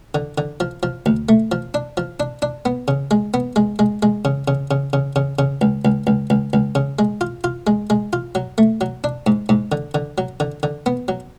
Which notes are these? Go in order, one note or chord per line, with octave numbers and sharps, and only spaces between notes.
D3
D3
F3
F3
D2
A3
F3
D4
F3
D4
D4
B3
C#3
G#3
B3
G#3
G#3
G#3
C#3
C#3
C#3
C#3
C#3
C#3
C#2
C#2
C#2
C#2
C#2
C#3
G#3
F4
F4
G#3
G#3
F4
F#3
A3
F#3
D4
G#2
G#2
D3
D3
F#3
D3
D3
B3
F#3